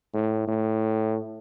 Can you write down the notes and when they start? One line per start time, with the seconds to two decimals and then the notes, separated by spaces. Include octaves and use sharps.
0.14 A2
0.48 A2